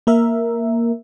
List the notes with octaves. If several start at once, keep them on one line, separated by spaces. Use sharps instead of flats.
A#3 A#4 E5